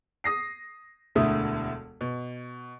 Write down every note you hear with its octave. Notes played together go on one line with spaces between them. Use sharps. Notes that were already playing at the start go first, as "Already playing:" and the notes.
D#6 A#6 C7
E1 D2 D3 A3 E4 D#6
B2